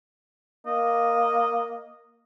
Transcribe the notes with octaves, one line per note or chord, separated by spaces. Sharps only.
A#3 D#5